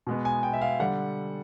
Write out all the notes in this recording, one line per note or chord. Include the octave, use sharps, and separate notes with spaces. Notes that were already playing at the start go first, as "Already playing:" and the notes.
B2 G#3 B3
G#5
G5
E5
F5
D3 G3 F#5